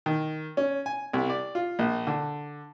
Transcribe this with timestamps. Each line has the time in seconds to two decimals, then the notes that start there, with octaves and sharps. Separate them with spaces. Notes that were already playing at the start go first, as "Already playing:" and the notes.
0.06 D#3
0.57 C#4
0.86 G#5
1.13 C2
1.30 D5
1.55 F4
1.79 A#1
2.07 D3